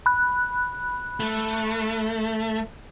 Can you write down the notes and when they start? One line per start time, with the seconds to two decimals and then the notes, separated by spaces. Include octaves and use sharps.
0.06 B5 F#6
1.20 A3